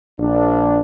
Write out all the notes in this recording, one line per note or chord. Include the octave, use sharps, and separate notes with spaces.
A#1 D4